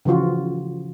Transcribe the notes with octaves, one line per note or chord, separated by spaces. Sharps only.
C#3 E3 F3 F4 F#4